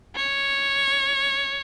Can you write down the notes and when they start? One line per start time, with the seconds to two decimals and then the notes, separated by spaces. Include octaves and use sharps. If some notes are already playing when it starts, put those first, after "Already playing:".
0.16 C#5